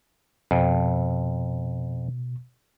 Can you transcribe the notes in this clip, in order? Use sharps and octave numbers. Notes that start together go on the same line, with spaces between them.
F2 B2